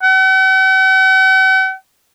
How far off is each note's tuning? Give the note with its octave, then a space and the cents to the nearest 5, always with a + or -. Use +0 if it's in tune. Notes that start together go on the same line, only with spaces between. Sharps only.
F#5 +45